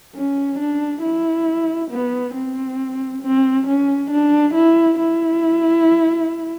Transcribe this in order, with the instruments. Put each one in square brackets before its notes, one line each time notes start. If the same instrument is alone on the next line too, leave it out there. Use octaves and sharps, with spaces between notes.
[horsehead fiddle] C#4
D4
E4
B3
C4
C4
C#4
D4
E4
E4